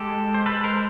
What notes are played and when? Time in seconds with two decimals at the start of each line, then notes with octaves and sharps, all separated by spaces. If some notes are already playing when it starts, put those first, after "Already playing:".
Already playing: G#3 G4 A4
0.34 C5
0.46 A4 B4
0.64 A#4 C5